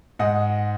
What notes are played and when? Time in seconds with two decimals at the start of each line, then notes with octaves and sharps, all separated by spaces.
0.19 G#2 D#5 F#5